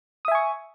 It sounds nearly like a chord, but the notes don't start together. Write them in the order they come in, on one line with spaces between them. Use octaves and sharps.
D#6 E5 G#5 C#6